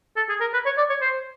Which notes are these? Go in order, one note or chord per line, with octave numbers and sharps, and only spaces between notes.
A4
G#4
A#4
B4
C#5
D5
C#5
C5